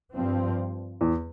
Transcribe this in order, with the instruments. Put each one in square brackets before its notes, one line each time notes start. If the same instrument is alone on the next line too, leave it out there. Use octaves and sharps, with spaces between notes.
[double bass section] G2 F3 C4
[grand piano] E2